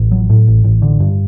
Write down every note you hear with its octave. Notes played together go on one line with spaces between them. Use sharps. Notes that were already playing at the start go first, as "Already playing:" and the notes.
Already playing: A1
F#3
A2
A1
A1
D3
G2